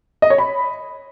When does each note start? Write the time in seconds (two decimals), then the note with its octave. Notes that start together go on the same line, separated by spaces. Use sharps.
0.22 D#5
0.30 C#5
0.38 B5